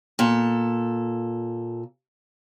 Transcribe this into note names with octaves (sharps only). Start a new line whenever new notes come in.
A#2 A4